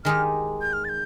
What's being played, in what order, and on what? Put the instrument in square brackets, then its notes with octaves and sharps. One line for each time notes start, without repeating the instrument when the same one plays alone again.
[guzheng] D#3 G#3 D#4 G4 [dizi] F6
[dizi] G6
F6
A6
G6